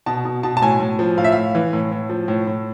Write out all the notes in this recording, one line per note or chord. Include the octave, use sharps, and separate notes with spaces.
B2 A5
B2
B2 A5
A5
A2 G#5
A2
F3
A2 F5
E5
A2 F5
E3
A2
A2
F3
A2
A2